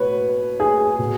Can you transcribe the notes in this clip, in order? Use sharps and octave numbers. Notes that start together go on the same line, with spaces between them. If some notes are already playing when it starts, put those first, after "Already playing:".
Already playing: B2 B4 C#5
G#4
B2